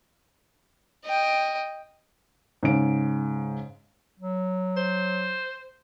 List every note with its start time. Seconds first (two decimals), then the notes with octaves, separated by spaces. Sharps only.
1.05 D#5 G5
2.63 G#2 C#3 D7
4.19 F#3
4.77 C5